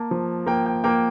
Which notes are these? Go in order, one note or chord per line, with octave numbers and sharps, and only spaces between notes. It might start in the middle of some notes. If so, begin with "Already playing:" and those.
Already playing: A#3 A5
F3
A#3 G5
G5
A#3 G5